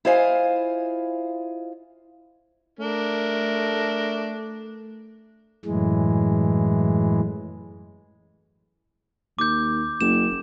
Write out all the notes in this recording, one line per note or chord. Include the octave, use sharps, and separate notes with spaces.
E4 F4 C5 D#5 F5 G#5
A3 D4 A#4
F#2 A2 E3 G#3
D#2 D6 G6
F#1 E7